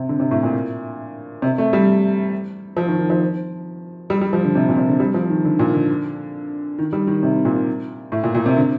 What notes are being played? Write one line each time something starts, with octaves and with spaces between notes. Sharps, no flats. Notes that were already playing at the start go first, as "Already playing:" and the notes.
Already playing: C3
D3
C3
A2
A#2
C3
A3
G3
F3
D#3
D#3
F3
G3
G3
F3
D3
C3
A#2
C3
D3
G3
F3
D#3
D3
A#2
D3
D#3
G3
D#3
C3
A#2
A2
A#2
A#2
C3
D3